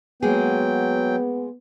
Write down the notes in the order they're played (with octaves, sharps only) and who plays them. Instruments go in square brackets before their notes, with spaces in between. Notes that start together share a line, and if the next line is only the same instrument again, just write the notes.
[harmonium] F#3 G5 [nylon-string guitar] G#3 A#3 G#4 [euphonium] B3